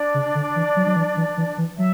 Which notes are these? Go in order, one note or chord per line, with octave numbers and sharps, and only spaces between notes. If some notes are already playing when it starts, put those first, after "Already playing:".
Already playing: D4 D5
C#3
D3
E3
F#3
F#3
E3
E3
E3
E3
F#3 E5